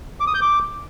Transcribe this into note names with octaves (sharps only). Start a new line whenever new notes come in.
D6
D#6
G6
D6